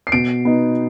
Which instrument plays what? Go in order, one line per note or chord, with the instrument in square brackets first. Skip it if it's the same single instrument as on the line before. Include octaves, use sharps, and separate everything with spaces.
[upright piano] C7
B2 D7
B3 D#4